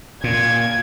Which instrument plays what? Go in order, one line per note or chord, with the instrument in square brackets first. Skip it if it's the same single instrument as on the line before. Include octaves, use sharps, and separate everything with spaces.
[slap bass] A#2 [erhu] G#6